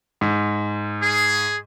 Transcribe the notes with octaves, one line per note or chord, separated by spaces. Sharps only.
G#2
G#4